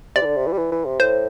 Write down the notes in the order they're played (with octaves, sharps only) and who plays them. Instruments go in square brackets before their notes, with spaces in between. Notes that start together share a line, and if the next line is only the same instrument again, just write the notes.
[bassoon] C3 [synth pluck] D5
[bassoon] E3
D3
C3
E3
G3
E3
E3
C3
[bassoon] A2 [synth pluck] C5